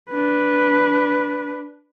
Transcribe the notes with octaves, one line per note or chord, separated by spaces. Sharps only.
D4 B4